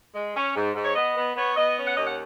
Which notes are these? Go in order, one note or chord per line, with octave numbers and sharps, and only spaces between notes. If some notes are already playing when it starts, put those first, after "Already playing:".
G#3
C#4
G#2
G#2
C#5
B3 D#5
B3
B3 C#5
B3 D#5
C#4
F#5
D#2 D#5
F#5